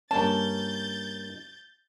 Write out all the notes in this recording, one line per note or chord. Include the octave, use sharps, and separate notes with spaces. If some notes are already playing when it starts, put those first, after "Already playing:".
G2 A#3 C#4 A5 G6 A6